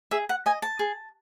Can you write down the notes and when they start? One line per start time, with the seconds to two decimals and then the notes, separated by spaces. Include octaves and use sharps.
0.11 G#4 E5
0.29 F#5
0.46 D#5 G#5
0.62 A5
0.79 G#4